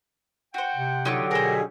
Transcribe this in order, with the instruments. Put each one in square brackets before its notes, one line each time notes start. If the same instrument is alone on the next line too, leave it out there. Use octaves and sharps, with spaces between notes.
[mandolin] F#4 C5 [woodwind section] F#5 G5
[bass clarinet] C3
[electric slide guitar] D3 F#3 G4 [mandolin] D#4 F4 C#6
[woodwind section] B2 [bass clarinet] G#4 [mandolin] A#4 C5